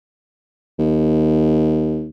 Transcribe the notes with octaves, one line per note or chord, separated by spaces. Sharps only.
D#2